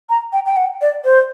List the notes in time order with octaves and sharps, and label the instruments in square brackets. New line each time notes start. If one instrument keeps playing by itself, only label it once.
[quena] A#5
G5
G5
F#5
D5
C5